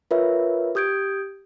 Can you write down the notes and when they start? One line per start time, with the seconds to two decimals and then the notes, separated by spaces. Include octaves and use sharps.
0.11 F4 A#4 B4 C#5 E5
0.75 G4 D#6 G6 G#6 D7